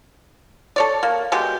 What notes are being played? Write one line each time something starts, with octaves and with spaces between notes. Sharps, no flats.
A4 C#5 D5
A#3
B2 G#3 G4